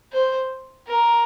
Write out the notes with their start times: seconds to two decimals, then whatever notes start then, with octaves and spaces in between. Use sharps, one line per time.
0.12 C5
0.87 A#4